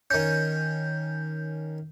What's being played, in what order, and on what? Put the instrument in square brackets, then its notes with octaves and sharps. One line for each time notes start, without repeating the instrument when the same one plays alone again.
[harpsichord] D#3 C#4 [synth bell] G6